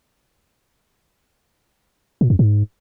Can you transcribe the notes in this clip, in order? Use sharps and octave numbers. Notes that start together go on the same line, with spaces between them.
A#2
F2
G#2